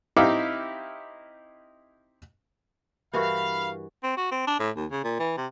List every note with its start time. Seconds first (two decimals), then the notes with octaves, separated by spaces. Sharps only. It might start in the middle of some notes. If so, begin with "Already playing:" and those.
0.16 C4 D#4 E4 G4 F5 D6
3.13 G2 E3 F#4 A#4 B4 F5 B5 C#6
4.03 C4
4.17 F#4
4.31 C4
4.47 D4
4.59 A2
4.76 D#2
4.91 C#3
5.04 A#2
5.19 E3
5.37 C3